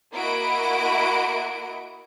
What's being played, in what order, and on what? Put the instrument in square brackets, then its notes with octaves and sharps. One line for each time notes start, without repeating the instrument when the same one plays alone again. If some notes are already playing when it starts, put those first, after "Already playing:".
[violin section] A#3 E4 F#4 D#5 B5 D7